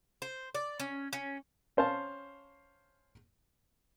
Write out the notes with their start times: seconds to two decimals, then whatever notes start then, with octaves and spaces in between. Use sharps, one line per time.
0.22 C5
0.55 D5
0.80 C#4
1.13 C#4
1.77 C#4 C5 F5 A5